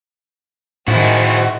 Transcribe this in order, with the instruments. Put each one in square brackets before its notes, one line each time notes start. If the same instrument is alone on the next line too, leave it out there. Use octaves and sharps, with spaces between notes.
[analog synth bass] A2 [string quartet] D#3 G#3 C4 [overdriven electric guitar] F3 E4 [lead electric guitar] F#4